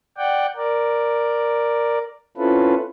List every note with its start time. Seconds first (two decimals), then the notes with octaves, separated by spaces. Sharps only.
0.18 D5 F#5 G5
0.56 A#4 D5
2.38 C4 C#4 E4 F4 A4 B4